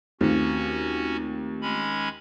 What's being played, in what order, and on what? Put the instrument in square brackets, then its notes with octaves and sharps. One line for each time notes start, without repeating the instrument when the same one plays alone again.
[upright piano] D#2 [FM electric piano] A3 C4 F4 [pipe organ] C#4 F#4
[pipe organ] G#3 C#4 B5